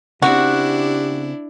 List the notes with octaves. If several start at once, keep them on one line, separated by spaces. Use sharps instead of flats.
C#3 C4 D4 E4 F#4 G4